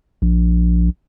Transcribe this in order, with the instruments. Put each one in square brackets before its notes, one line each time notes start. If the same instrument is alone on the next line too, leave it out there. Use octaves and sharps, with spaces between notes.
[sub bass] A#1